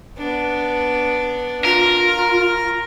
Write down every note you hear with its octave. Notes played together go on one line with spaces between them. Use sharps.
B3 D4
F4 A#4 F6